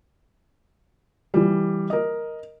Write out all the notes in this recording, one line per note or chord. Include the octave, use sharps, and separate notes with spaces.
E3 G3
A#4 D#5